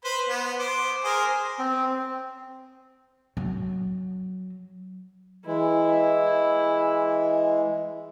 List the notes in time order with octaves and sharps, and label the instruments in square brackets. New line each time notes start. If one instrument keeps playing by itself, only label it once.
[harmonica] B4 C5 B5
B3
C5 D6
G#4 A#4 C5
[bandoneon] C4
[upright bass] F#3
[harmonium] E3 G#3 [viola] E4